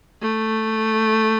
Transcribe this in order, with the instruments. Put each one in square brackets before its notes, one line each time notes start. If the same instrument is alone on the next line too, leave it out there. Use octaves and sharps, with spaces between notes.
[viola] A3